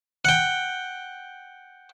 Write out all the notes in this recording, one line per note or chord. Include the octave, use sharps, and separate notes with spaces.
F#5 G5